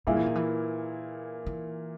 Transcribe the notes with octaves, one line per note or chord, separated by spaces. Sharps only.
A#2 G3 A#3 E4 G#4
E3
D#3
E3
E3